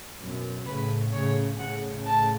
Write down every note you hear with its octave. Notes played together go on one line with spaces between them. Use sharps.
F#2 B2
A2 C#3 B4
A2 C#3 C#5
A2 C#3 F#5
A5